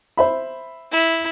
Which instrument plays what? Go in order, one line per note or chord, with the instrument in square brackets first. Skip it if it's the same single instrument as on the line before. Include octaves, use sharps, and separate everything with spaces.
[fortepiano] C5 E5 B5
[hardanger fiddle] E4